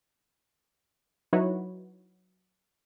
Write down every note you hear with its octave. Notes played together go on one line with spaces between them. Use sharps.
F#3 D#4 E4 F#4 B4 C#5